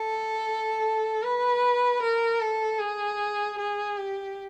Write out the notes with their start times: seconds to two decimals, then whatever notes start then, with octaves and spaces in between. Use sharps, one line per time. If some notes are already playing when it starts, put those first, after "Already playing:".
Already playing: A4
1.23 B4
2.02 A#4
2.40 A4
2.79 G#4
3.58 G#4
3.97 G4